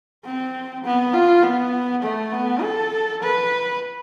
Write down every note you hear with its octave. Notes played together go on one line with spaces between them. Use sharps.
C4
B3
F4
B3
A3
B3
A4
B4